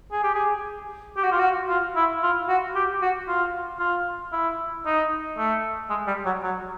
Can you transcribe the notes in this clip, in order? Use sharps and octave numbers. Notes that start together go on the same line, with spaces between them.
G#4
G4
G#4
G4
F#4
F4
F#4
F4
E4
F4
F#4
G4
F#4
F4
F4
E4
D#4
A3
G#3
G3
F#3
F#3